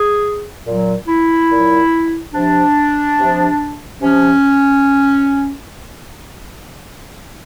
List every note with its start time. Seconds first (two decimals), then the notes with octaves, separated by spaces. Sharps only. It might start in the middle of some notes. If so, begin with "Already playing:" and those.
Already playing: G#4
0.66 A#2 F#3
1.08 E4
1.51 A#2 F#3
2.34 C3 F3 D4
3.18 C3 F3
4.02 C3 F3 C#4